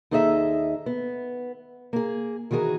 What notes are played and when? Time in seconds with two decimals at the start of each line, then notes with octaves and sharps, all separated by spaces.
0.11 D#2 D#4 G#4 A4 D#5 E5
0.86 B3
1.93 A#3 G#4
2.51 D#3 E3 F#4 G#4 A#4